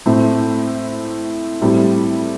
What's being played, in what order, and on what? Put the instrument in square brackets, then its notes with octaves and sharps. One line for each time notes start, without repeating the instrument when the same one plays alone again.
[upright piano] A2 A3 C4
A2 G3 C4 E4